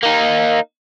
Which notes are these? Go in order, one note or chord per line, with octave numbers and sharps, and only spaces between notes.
A#3 D#4